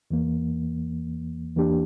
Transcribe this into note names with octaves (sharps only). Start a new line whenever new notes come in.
E2 E3 A#3
E2 E3 A#3 D4 G4